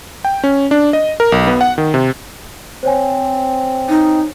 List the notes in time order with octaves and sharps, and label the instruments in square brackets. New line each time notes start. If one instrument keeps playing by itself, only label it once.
[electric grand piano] G5
C#4
D4
D#5
A#4
B1
B3
F#5
D#3
C3
[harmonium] C4 [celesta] C5 C#5 G#5
[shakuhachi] D#4